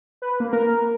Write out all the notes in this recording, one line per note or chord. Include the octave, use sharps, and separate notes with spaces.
B4
A#3
A#4